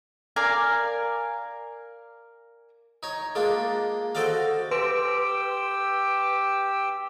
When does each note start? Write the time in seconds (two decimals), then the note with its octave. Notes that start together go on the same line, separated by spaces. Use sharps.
0.36 A#4 D5 F5 G#5
3.03 D#4 C#5
3.35 G#3 A#3 D4 F4
4.15 F#4 A4 C5 D5 D#5 F5
4.71 G4 B4 G5 C6 E6 D7